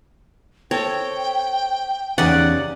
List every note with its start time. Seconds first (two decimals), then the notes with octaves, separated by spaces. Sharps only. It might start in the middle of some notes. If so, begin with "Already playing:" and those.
0.71 C4 A4 C#5 G5
2.18 E2 C#3 C#4 D#4 G4 D5 F#5